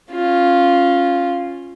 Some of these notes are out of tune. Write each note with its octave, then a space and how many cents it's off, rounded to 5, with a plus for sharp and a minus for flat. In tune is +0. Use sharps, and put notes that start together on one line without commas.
C#4 -15 F4 +0